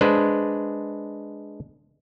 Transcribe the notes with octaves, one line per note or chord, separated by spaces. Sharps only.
G#3 D4 B4 C5